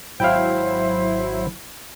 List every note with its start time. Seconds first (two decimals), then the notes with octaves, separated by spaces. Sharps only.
0.20 G#1 F#3 E4 C5 F5 G5